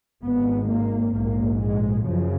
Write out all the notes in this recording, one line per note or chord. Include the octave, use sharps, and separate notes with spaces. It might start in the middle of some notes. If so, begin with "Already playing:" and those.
G#1 G#2 B3
A#3
A#1 G#2 A#3
G#3
F#2 C#3 F3